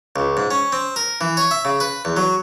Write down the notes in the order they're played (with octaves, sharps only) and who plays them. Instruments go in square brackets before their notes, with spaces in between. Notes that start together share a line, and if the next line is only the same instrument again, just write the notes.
[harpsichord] C#2
G#2
C#4
C4
A#4
E3
C#5
E5
C#3
B4
E2
F#3